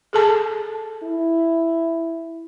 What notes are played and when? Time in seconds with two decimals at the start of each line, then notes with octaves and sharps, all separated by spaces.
0.13 G#4 A4 A5
1.03 E4